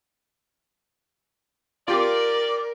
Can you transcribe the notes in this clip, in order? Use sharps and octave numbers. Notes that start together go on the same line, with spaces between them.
F4 G4 A#4 D5